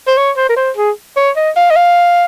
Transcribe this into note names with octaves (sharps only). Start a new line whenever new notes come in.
C5
C#5
C5
A#4
C5
G#4
C#5
D#5
F5
D#5
F5